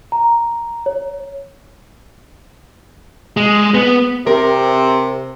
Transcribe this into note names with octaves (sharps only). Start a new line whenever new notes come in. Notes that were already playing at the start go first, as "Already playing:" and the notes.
A#5
C#5
G#3
B3
C3 A#4